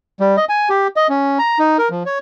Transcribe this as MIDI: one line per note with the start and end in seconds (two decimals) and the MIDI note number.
0.20 0.36 55
0.37 0.45 75
0.49 0.69 80
0.70 0.87 67
0.96 1.07 75
1.10 1.38 61
1.39 1.59 82
1.59 1.77 63
1.79 1.89 70
1.91 2.03 53
2.06 2.19 73